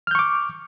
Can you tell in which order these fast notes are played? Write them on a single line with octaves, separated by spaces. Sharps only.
F6 G6 C#6 D6